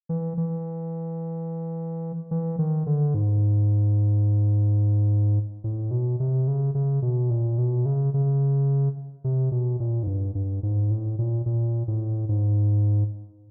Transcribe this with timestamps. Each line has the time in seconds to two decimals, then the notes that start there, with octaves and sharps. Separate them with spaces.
0.09 E3
0.37 E3
2.31 E3
2.59 D#3
2.86 D3
3.14 G#2
5.64 A2
5.91 B2
6.20 C3
6.48 C#3
6.75 C#3
7.02 B2
7.30 A#2
7.58 B2
7.86 C#3
8.14 C#3
9.24 C3
9.52 B2
9.80 A#2
10.03 G#2
10.07 G2
10.35 G2
10.63 G#2
10.91 A2
11.19 A#2
11.46 A#2
11.88 A2
12.29 G#2